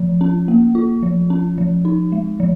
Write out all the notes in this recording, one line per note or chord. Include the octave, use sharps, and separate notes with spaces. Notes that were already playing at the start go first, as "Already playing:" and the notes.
Already playing: F3
C#4
A#3
F4
F3
C#4
F3
D#4
G#3
F3